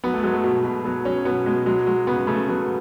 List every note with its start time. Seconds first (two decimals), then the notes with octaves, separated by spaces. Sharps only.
0.04 F#3 B3
0.14 A3
0.23 F#3 G#3
0.33 A3
0.44 B2
0.65 B2
0.84 F#3 B3
1.05 F#3 C#4
1.25 B2 B3
1.46 B2 G#3
1.66 F#3 G#3
1.86 F#3 G#3
2.07 C#3 B3
2.27 C#3 A3
2.48 F#3 B3